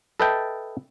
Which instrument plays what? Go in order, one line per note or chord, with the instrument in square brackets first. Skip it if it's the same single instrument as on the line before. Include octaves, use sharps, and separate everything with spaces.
[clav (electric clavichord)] A4 B4 D#5 E5 G5 A5